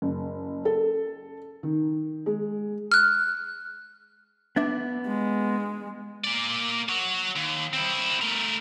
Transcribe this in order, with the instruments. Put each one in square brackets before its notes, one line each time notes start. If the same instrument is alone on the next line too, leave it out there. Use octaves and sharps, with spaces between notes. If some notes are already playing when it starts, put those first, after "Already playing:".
[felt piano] F#1
A4
D#3
G#3
[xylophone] F6 F#6
[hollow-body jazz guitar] B3 D4 E5
[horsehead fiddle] G#3
[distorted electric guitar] A#3 D5
F#4 C#5
D#2
C4 E4
A3 A#4